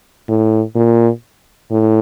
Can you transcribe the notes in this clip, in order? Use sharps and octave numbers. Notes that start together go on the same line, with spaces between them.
A2
A#2
A2